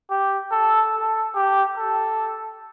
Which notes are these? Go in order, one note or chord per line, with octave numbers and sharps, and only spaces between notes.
G4
A4
A4
G4
A4